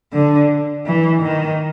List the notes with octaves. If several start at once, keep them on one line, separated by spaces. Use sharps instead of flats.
D3
E3
D#3